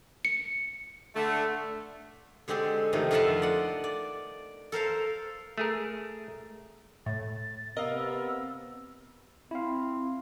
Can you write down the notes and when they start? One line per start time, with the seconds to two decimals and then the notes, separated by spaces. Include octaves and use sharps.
0.25 C#7
1.15 D3 A3
2.48 D3 G#3 C4 G4 A4
2.93 C3 D#3 F3 A3
3.11 F2 D3 F4 E5 F#5 A5
3.42 D5 D#5 F#5
3.84 D5
4.72 A4 A#4 C5 F5
5.58 A3 G#4 A#4
7.06 A2 A6
7.77 C3 B3 A#4 D#5 F5 E6
9.51 C4 E4 F5